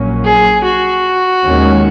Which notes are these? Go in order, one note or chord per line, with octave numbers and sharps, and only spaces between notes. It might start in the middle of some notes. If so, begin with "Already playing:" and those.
Already playing: A#1 A#2 F#3 A#3 C#4
G#4
F#4
D#2 D#3 G#3 C#4